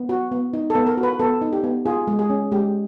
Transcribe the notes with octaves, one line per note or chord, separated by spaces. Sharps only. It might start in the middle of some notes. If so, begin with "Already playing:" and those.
Already playing: B3
F#4
B3
D#4
A4
B3
A#4
F#4
B4
B3 A4
D#4
G4
B3
F4 G#4
G#3
G#4
C#4
G#3 G4